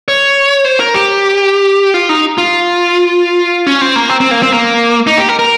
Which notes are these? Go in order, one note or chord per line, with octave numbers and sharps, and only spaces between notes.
C#5
C5
A#4
G4
F4
D#4
F4
C#4
C4
A#3
C4
C4
A#3
C4
A#3
D#4
G4
A#4
A#4